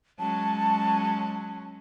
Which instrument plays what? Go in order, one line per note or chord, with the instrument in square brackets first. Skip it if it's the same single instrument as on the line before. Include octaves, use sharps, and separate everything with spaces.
[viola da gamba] F#3 G#3 C#4 [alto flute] A5